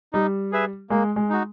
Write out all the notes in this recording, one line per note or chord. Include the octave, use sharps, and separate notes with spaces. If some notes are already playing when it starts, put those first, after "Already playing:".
G3 D#4
G#4 B4 E5
G#3 A#3
G#3
D#4 F#4